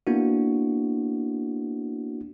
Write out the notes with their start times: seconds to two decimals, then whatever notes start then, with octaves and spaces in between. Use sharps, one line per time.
0.07 A#3 B3 D4 E4 F#4